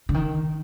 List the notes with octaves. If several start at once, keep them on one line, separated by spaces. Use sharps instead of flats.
D3
D#3